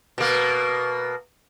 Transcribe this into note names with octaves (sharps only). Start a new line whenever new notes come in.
B2 A#3